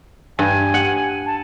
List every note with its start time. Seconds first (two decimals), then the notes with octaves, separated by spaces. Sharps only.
0.39 G2 G#5
0.74 F#5
1.26 A5